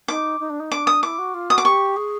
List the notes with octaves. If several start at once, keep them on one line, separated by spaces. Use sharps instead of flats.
D#4 D6
D#4
D4
D#4
D4 D6
D#6
E4 D6
F#4
F4
F#4 D#6
D6
G4 C#6
G#4